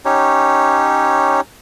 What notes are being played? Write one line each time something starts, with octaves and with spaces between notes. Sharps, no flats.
C#4 D#4 G4 C#5